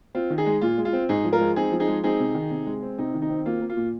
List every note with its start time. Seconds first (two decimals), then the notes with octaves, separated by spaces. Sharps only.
0.15 C4 F4
0.30 D#3
0.38 D#4 G#4
0.46 G#3
0.61 A#2 F4
0.78 G#3
0.85 F4
0.93 C4
1.09 G#2 D#4 G#4
1.25 F3
1.33 F4 A#4
1.40 G#3
1.56 C4 D#4 G#4
1.72 F3
1.80 D#4 G#4
1.88 G#3
2.04 C4 D#4 G#4
2.20 C3
2.35 D#3
2.51 C3
2.66 G#3
2.82 C4
2.98 C3 D#4
3.14 D#3
3.22 D#4
3.30 C4
3.45 A#3 F4
3.61 A#3
3.70 F4
3.77 A#2